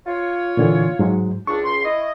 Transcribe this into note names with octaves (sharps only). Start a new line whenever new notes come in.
F4 C#5
A#2 D3 E3
G#2 F#3 G#3
C#2 D4 C#6
C#2 C6
E4 D#5